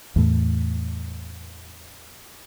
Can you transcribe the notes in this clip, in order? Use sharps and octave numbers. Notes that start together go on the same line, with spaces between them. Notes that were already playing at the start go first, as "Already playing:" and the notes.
E2 A2